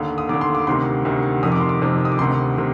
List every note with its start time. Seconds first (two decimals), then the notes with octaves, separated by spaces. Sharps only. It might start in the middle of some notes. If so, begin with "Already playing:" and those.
Already playing: D#2 D3 D#6
0.18 D#6
0.29 D#2 D3 D6
0.41 C6
0.55 D6
0.67 D2 C3 D#3 C6
1.05 D2 C3 D#3
1.43 F2 C3 D#3 D#6
1.52 D6
1.60 C6
1.69 D6
1.82 F2 C3 D#3
2.05 D#6
2.12 D6
2.19 D2 C3 D#3 C6
2.58 C3 D#3